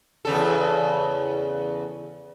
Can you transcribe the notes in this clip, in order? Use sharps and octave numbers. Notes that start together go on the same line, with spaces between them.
E2 C#3 A4